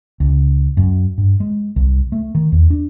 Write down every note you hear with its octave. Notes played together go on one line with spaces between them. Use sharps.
C#2
F#2
G2
G#3
C2
A3
D#3
E2
D4